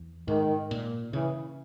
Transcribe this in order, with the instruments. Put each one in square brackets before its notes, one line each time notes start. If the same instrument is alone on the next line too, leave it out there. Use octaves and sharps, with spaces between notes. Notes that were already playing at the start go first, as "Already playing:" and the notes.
Already playing: [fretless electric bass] E2
[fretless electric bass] G#2 [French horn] D#3
[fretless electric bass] A#2
[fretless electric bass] C#3 [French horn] E3